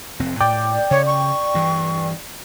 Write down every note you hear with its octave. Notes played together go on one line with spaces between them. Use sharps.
F1 F2 C4
A2 D5 G5
C#3 C#5
C#6
G2 E3